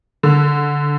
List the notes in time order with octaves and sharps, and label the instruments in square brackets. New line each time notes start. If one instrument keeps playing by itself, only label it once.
[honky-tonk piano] D3